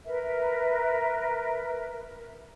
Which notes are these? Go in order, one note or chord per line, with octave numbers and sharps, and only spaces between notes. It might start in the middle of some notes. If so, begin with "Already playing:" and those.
A#4 B4 E5